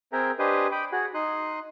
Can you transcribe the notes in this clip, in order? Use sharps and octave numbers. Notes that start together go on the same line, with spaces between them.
C4 G#4 A#4 E5 G5 A#5
D4 G4 B4 C5 D#5 G#5
G5 B5 D6 D#6
F#4 G#4 F#5
D#4 C6 D#6 F#6